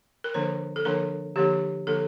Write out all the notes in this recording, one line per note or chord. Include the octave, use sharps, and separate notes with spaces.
A#4
D3 F3 A#3 D4 C5
A4
D3 F3 A#3 D4 A#4
D3 F3 A#3 D4 G4
D3 F3 A#3 D4 A4